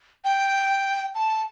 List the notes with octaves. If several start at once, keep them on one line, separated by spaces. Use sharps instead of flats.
G5
A5